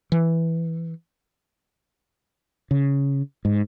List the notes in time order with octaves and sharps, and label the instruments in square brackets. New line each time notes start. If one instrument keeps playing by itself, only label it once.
[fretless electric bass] E3
C#3
G#2